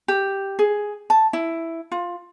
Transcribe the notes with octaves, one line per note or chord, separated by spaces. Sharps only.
G4
G#4
A5
E4
F4